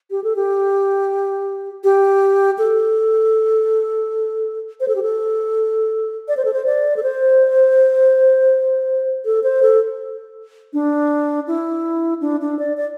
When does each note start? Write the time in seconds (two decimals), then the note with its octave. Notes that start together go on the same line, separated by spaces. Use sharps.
0.11 G4
0.24 A4
0.36 G4
1.84 G4
2.58 A4
4.80 C5
4.88 A4
4.95 G4
5.03 A4
6.28 D5
6.37 C5
6.45 A4
6.53 C5
6.66 D5
6.97 A4
7.03 C5
9.25 A4
9.43 C5
9.62 A4
10.73 D4
11.47 E4
12.21 D4
12.41 D4
12.59 D5
12.77 D5